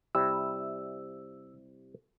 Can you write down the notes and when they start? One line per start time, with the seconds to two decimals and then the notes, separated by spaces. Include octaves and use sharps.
0.15 C3 G3 E4 E6